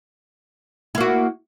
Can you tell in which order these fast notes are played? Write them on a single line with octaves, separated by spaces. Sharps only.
E4 A#3 F#4